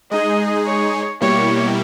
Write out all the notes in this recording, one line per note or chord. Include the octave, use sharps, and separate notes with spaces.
G#3 D#4 G#4 D#5
C#5
B2 G3 A#3 E4 G4 C#5